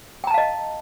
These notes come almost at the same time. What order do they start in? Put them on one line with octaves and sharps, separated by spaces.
G5 A#5 A5 F5 D#5